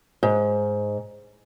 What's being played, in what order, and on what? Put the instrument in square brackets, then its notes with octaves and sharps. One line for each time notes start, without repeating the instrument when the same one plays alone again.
[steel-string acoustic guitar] G#2